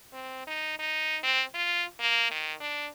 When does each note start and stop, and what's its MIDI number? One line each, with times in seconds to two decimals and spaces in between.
0.13 0.44 60
0.47 0.77 63
0.79 1.18 63
1.23 1.43 60
1.55 1.85 65
2.00 2.30 58
2.31 2.54 51
2.60 2.88 62